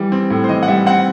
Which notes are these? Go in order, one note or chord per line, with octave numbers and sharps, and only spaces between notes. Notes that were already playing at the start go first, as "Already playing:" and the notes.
Already playing: E3 G3
C4
A2
C5
E3 D#5
F#5
G3 E5
C4 F#5